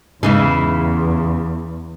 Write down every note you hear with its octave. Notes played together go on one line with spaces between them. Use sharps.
E2 G#2 C#3 E3 G#3 E4